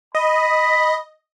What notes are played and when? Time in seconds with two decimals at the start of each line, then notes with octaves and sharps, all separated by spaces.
0.15 D#5 B5